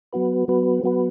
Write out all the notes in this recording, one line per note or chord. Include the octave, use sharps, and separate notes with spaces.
F#3 B3 F#4 B4
F#3 B3 F#4 B4
F#3 B3 F#4 B4